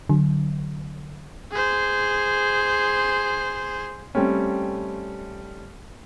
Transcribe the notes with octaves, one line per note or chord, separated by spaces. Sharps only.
D3 F#3
G#4 C5
G3 A3 C4 C#4